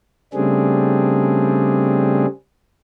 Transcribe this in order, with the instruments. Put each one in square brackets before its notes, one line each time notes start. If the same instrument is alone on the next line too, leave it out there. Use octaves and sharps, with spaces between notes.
[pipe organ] C#3 G3 A3 C4 D4 G#4